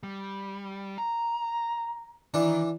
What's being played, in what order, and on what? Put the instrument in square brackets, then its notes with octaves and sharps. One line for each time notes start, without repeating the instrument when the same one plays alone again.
[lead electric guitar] G3
A#5
[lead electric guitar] D#3 [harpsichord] E3 D4